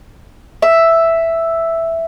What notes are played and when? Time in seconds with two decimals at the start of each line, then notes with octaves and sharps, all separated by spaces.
0.62 E5